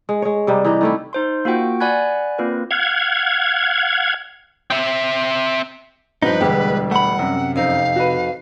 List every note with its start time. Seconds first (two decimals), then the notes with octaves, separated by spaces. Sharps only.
0.09 G#3
0.22 G#3 C#5
0.47 C3 G3 D#4
0.65 E3 D#4 G4 D#5
0.81 D#3 A3 E4
1.13 D#4 C5 C6
1.45 A#3 F4 F#4 F#5 G5
1.80 D5 F#5 G#5 B5 F#6 G#6
2.39 A#3 C4 F4 B4
2.71 F5 F#5 G#6
4.70 C4 E5
6.22 G2 F3 F#3 D#4 B4
6.41 E1 D2 G3 G#3 G4
6.91 A3 F#5 B5
7.19 F#2 C3
7.56 F2 D#4 F5
7.96 F#4 B4